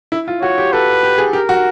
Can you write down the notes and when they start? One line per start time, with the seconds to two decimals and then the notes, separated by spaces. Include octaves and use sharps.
0.12 E4
0.28 F4
0.42 F#4 C#5
0.58 G4
0.72 A4 B4
1.03 G4
1.18 G#4
1.33 G4 A#4
1.49 F#4